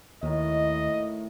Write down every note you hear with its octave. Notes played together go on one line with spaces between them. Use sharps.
D#2 A2 D#3 D#5